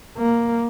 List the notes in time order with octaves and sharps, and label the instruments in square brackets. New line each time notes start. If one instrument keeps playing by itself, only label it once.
[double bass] A#3